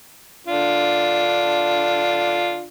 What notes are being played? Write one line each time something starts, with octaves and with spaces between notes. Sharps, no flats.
D3 D4 F4